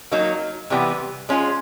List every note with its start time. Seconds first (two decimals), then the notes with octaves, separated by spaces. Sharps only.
0.12 F#3 A#3 D#4
0.70 C3 E3 G3 B3
1.29 G#3 C#4 F4